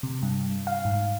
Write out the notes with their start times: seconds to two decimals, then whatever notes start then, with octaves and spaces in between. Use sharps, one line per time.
0.03 C3
0.22 G2
0.67 F5
0.85 G#2